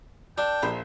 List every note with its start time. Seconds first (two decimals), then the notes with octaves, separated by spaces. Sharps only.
0.38 D4 A4 G5
0.62 A#1 C5 E5 B5